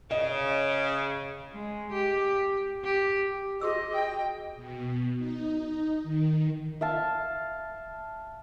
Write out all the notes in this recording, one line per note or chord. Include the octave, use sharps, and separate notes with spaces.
C#3 D#5
G#3
G4
G4
F#4 G#4 D#5 E6
G5
B2
D#4
D#3
E5 F5 A5